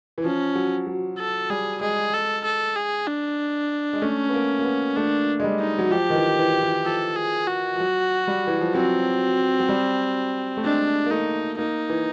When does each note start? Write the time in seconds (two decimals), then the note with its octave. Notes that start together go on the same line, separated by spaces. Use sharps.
0.18 E3
0.24 F3 C#4
0.55 F#3
0.87 F#3
1.19 A4
1.50 G3 G#4
1.81 G#3 G#4
2.13 A4
2.45 A4
2.76 G#4
3.07 D4
3.93 G#3
4.02 A3 C#4
4.29 B3
4.34 A#3
4.59 A#3
4.64 B3
4.97 A3 D4
5.40 G#3
5.44 G3
5.59 D#4
5.79 F#3
5.91 F3 G4
6.10 D#3
6.15 E3
6.39 E3
6.62 E3
6.85 F3 A4
7.16 G#4
7.48 F#4
7.75 F3
7.80 F#3
8.27 G3
8.47 E3
8.61 F3
8.74 F#3 C4
9.60 F#3
9.69 G3
10.57 A3
10.64 G#3 D4
11.06 A#3
11.10 A3 D#4
11.58 A#3 D#4
11.89 E3